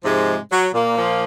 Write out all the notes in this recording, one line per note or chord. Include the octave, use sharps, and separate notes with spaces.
G#2 C3 F3 G#3
F#3
A#2 A#3
A#2 F3